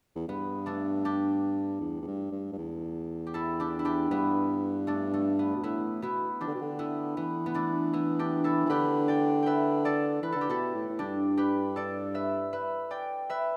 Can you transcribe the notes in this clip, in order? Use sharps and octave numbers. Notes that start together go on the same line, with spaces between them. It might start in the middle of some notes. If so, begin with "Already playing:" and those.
E2
G2 B3
A3 D4
D4 G4
E2
E2
G2
G2
G2
E2
G4
E4 A4
D4 G4
E4
D4 G4
G2 B3 E4
A3 D4
A3
B3
B2
A2 B3 E4
B2 B3 E4
E3 D4 G4
D3
B2
D3
B3 E4
E3 B3
B3
A3 D4
B3 E4
D4 G4
E4 A4
E3
D3 G4 B4
D5 G5
B4 E5 G5
A4 D5
E3 B4
D3 A4
G4
B2 E4 A4
A2
A2
G2 D4 G4
G4 B4
A4 D5
B4 E5
B4 E5
D5 G5
B4 E5